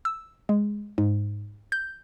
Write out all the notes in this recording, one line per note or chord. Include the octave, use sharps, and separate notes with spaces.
E6
G#3
G#2
G6